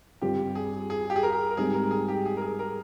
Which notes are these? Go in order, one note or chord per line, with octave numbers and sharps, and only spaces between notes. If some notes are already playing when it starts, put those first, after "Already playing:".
G2 G3 C4 F4 G4
G#4
G#4
G4
G#4
A#4
A#4
G#2 G3 C4 D#4 G#4
A#4
G#4
G4
G#4
A#4
G#4
A#4